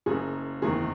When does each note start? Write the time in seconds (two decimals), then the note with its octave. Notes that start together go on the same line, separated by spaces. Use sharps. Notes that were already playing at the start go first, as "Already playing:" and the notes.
0.06 F#1 F#2 C#3 G#4
0.62 F#1 E2 D#3 G#4